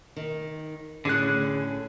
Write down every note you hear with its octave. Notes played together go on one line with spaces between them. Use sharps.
D#3
A2 D3 C#4 G#4 F#6